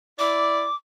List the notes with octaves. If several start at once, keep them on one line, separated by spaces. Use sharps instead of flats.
E4 D5 D6